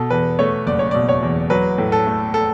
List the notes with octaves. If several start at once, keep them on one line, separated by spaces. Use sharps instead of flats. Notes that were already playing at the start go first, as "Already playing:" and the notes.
Already playing: B2 A4
E2 B4
A3 C#5
F#1 D5
C#5
B2 D5
C#5
E2
F#3 B4
A2
A4
A3
A4